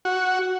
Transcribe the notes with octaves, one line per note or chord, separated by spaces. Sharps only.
F#4